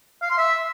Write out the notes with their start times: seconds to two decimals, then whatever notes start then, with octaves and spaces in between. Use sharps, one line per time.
0.22 F5
0.30 C6
0.38 E5